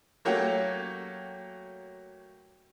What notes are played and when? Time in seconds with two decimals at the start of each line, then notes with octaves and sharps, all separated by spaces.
0.25 F#3 A3 A#3 C#4 F#4 G4